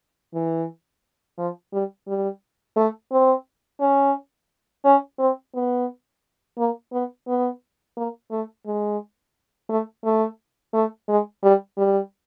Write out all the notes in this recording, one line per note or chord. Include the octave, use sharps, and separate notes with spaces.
E3
F3
G3
G3
A3
C4
C#4
C#4
C4
B3
A#3
B3
B3
A#3
A3
G#3
A3
A3
A3
G#3
G3
G3